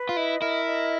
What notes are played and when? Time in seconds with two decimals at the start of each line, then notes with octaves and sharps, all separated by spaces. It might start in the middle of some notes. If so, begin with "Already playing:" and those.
Already playing: B4
0.09 F4
0.17 E4 D#5
0.42 E4 A#4
0.66 D#5